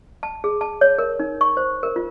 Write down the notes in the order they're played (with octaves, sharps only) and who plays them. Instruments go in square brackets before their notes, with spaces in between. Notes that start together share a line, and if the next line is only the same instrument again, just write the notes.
[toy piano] A5
G#4
A5
C#5
A#4
D#4
C#6
C5
A#4
F4